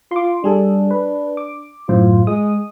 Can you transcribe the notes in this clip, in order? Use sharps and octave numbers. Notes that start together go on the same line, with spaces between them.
F4 C6 D6
G3 D4 G#4 A4
B4
D6
F#2 A2 F4 C5
G#3 D#6